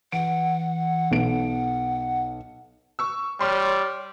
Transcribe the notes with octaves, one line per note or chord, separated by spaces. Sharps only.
E3 F#5 D7
B1 B3 D7
C#6 E6
G3 C#5 C6 F6